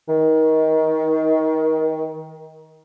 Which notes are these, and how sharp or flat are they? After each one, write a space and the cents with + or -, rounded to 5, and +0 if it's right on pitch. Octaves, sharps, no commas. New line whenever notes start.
D#3 +25